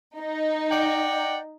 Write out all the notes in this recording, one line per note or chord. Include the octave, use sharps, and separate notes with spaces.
D#4
D5 F#5 G5